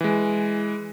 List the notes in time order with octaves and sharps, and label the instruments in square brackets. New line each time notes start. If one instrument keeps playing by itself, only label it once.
[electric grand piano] E3 G#3